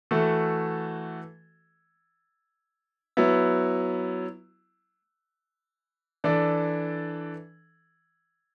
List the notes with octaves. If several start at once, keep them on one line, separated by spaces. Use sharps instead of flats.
E3 A3 F#4 A4
F#3 B3 E4
E3 D4 A4 D5